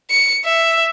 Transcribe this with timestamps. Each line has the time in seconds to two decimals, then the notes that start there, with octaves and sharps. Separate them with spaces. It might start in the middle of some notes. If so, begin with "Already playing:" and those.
0.10 C#7
0.44 E5